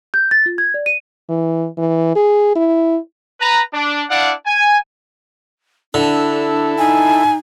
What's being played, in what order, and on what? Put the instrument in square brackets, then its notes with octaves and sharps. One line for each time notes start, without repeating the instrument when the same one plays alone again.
[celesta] G6
A6
F4
G#6
D5
D#7
[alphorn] E3
E3
G#4
E4
[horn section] B4 A#5
D4
D4 E4 D5 F5 F#5
G#5
[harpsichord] D3 [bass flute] D4 [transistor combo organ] E4 A4
[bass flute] D#4 [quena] G#5